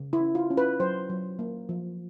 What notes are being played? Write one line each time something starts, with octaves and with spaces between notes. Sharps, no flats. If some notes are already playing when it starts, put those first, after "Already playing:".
Already playing: C#3
E4
C#4
F4
C#4
B4
F#3 C5
F#3
A#3
F3